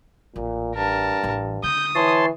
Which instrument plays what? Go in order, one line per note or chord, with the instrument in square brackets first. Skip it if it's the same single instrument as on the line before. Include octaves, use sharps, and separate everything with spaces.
[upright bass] A1 [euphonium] A#2
[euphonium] G2 [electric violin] A#4 A5
[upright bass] A1 E3
[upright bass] D3 [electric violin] D#6 [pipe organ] G6
[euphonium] E3 [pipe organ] C#5 A5 C6